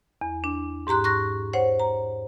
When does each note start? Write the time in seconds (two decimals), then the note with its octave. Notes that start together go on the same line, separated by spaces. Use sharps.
0.21 E2
0.44 D4
0.87 G#2 G4 A#5 C6 F#6
1.04 C#6 F#6 A#6
1.53 C5 C#5 F#5
1.79 A#5